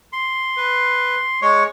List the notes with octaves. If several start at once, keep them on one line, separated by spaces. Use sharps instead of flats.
C6
B4
G#3 C#5 C#6